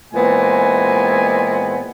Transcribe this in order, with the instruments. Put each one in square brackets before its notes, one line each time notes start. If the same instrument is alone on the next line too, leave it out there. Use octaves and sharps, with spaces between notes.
[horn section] A#2 E3 G#3 B3 C4 G#5